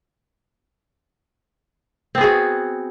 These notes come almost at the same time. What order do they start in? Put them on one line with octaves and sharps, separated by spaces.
C4 B3 G#4 F#4